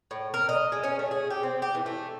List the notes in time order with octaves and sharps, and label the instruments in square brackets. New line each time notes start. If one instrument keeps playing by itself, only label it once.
[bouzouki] A2
A#4
D#5
G#3
C#4
A3
G#4
G4
C4
G4
E3
A3